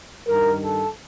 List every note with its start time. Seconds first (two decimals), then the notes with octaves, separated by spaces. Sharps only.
0.26 G2 D#3 A#4
0.62 A4